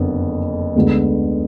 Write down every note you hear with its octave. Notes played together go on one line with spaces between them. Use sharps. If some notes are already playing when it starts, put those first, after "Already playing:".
Already playing: F#1 F2 D3 B3
D2 D3 G#3 B3